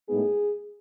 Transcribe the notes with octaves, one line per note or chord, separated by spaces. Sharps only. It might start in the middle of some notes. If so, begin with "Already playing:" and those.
A2 G#3 B3 D#4 G#4